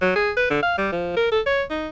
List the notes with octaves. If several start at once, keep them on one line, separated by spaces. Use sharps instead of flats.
F#3
G#4
B4
D3
F5
G3
F3
A#4
A4
C#5
D#4